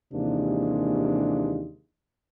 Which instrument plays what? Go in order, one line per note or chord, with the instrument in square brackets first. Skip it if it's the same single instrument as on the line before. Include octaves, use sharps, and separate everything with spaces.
[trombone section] D#2 C3 E3 G#3 A#3 D4